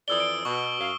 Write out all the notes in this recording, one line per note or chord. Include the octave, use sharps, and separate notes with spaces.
F2 E3 D5 D#6 E6 G7
D7
B2 C#6
F#2 F5